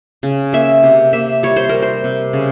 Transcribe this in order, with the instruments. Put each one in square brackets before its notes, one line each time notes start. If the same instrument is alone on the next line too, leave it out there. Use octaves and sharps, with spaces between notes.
[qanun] C#3
A#3 E5
C3
A#3 E5
G3 C#5
C5
G3 A#4
C5
C3
C#3